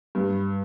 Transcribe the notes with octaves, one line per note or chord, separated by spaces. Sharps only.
G2